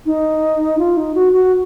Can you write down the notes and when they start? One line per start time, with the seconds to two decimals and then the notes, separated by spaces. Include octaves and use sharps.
0.06 D#4
0.79 F4
0.97 D#4
1.15 F#4
1.33 F#4